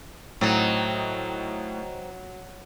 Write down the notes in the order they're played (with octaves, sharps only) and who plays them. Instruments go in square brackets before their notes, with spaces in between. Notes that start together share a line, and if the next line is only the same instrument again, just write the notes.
[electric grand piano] A2 A6 [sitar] F#3 [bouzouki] C4 D#4